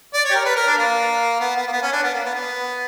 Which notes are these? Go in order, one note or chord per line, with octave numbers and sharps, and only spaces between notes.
D5
C#5
G4
A#4
B4
A#4
D4
A#3
B3
B3
A#3
B3
C#4
D4
B3
A#3
B3
B3